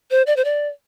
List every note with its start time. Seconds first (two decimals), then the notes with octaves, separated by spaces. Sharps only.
0.11 C5
0.27 D5
0.36 C5
0.45 D5